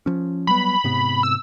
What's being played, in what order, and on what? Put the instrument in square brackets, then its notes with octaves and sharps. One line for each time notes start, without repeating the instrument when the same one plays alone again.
[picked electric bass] F3 C#4
[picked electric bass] F#3 G3 B3 [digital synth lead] B5
[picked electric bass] G#2 C3 B3
[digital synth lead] E6